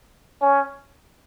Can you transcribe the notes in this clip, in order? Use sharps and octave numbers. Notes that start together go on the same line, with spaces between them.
C#4